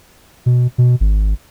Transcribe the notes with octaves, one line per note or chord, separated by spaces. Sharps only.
B2
B2
G#1